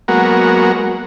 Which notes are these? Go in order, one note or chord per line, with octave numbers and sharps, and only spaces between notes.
F#3 G#3 A#3 B3 F#4 A#4